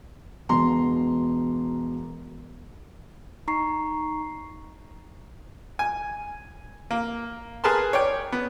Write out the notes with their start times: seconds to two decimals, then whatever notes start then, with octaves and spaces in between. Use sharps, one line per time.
0.49 E1 B2 A#5 C6
3.47 D#4 A#5 C#6 C7
5.79 G#5
6.91 A#3
7.64 G#4 A#4 B4 A5 C6
7.93 C#5 D5 G5
8.32 B3